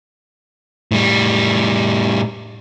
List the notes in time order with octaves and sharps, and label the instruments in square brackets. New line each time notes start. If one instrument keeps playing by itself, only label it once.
[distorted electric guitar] A2 G3